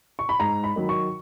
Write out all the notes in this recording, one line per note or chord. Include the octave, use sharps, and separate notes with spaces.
C#6
B5
G#2 A#5
B5
D#3 F#3
C#6